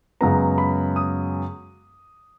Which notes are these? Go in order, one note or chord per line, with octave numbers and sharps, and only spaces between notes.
F#2 C#3 G#3 B3 A#5
B5
D#6